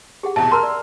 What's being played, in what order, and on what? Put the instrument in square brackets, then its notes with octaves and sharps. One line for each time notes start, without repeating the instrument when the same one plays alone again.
[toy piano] G4 G#4 F#5
[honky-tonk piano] A1 E2 B2 [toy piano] E5 A5
[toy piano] A#4 A#5 [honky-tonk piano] C6 E6 F6
[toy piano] D5